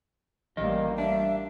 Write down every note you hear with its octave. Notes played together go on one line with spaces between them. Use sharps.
A1 E3 G3 A#3 D#5
D4 E5